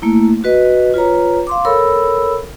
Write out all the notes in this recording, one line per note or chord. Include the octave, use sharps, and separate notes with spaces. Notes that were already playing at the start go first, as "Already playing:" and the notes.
A3 A#3 E4
F#4 B4 D#5
F4 B4 C#5 A#5
F5 C6 D6
A4 A#4 C#5 B5 E6